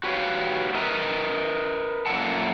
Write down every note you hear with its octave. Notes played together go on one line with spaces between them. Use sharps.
F#4 G4 B4 C#5 D#5 F5
A#4 B4 D#5 E5 A#5
F#2 A#2 A#3 A4 F#5 A5